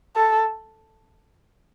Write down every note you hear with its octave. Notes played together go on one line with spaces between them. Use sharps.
A4